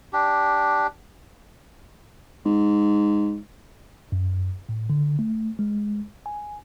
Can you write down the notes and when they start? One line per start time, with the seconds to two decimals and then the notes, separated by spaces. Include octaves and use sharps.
0.13 D4 G4
2.45 G#2
4.12 F#2
4.69 A2
4.90 D3
5.19 A3
5.59 G#3
6.26 G#5